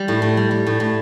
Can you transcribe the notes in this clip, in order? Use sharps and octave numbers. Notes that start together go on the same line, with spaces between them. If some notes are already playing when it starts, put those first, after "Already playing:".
Already playing: G3
A2
A2
G3
G3
A2
A2